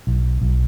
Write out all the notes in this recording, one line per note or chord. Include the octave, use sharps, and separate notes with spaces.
B1
B1